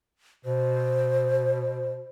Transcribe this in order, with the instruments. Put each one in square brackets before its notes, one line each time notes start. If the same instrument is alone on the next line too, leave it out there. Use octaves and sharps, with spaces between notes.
[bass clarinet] B2 [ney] C5